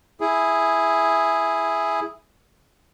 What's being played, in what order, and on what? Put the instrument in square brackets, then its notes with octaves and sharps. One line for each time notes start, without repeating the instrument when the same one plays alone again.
[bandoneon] E4 G#4